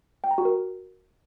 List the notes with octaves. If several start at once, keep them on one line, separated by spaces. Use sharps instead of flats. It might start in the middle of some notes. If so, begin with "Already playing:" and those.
G5
A#5
F#4
A#4